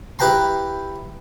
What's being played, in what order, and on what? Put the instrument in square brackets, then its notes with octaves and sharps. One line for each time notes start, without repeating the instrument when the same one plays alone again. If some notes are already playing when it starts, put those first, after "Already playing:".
[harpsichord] E4 G4 B4 G5 A#5 C6